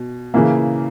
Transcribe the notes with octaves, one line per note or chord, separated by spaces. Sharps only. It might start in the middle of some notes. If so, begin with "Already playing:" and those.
Already playing: B2
C#3 E3 A#3 E4